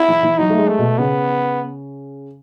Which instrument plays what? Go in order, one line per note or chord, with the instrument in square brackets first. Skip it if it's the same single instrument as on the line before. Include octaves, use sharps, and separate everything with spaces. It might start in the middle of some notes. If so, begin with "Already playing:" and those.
Already playing: [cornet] E4
[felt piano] E3
E3
[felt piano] F#3 [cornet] D#4
[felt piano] A3
G#3
[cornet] A3
[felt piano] B2
[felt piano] C#3 [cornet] B3